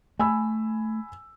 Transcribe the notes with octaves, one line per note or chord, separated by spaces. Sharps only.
A3 G#5 B5 E6